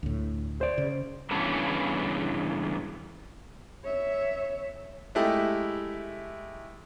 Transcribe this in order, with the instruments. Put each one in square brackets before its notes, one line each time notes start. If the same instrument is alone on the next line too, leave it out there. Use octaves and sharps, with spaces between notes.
[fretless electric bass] D2 A2
[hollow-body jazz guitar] C5 D5
[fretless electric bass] C#3
[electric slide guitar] G2 C#3 E3 B3 C#4 A5
[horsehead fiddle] C#5 E5
[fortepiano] G#3 A3 E4 G4